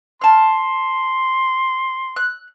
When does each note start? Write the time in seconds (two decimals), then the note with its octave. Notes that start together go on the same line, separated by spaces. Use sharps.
0.21 A5 C6 F6
2.16 F#6